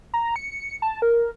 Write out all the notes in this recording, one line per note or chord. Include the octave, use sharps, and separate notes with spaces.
A#5
C#7
A5
A#4